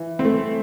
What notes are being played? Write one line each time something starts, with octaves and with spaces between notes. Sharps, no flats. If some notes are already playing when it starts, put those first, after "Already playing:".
Already playing: E3
C4
A3